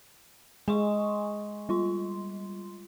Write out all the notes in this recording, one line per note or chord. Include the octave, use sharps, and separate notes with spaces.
G#3 G#5 C6 C#6
G3 F4 C6